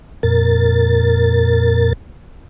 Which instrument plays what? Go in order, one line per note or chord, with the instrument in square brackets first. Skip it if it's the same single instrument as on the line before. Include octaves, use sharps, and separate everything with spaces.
[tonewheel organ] F2 A#2 A#4 A6